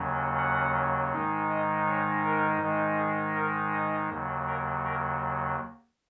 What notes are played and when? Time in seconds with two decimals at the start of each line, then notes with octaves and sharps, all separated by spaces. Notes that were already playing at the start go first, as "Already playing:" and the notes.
Already playing: D#2 C#3 F#3 C#4
0.38 F#5
1.12 G#2 D#3 G#3 D#4
1.49 D#5
1.87 C#5
2.24 A#4
2.61 G#2 D#3 G#3 D#4
2.99 G#4
3.35 A#4
3.73 D#5
4.10 D#2 C#3 F#3
4.47 A#4
4.84 A#4